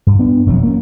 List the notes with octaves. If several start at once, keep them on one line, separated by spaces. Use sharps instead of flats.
G2
B3 D4
E1 F2 F#3
A#3 C#4